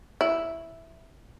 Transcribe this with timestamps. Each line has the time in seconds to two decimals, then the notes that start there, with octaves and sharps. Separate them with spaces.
0.21 E4